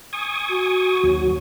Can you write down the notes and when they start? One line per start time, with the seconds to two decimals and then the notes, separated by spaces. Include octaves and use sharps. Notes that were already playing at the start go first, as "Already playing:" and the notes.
0.13 G#5 C#6 D#6
0.49 F#4
1.03 D#2 F#3